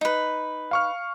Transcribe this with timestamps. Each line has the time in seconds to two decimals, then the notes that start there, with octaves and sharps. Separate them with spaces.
0.01 D#4 B4
0.71 F5 C#6 F6